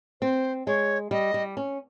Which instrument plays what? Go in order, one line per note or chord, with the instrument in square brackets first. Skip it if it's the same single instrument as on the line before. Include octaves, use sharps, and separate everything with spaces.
[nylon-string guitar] C4 [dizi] C5
[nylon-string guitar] G#3 [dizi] C#5
[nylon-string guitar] G3 [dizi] D#5
[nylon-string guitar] G3
C#4